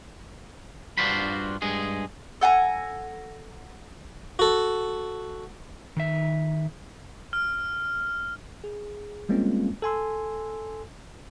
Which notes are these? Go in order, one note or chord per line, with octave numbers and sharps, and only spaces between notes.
G2 D4 F4 F#4 C5 B5
G2 G#3 G#4
A4 F#5 G#5 A#5
F#4 A4
D#3 D#4 E5
F6
G#4
G3 G#3 A#3 C4 C#4 F4
A4 G#5 C6 E6